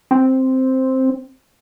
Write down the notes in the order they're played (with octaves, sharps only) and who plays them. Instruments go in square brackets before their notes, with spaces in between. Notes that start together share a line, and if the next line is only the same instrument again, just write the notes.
[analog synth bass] C4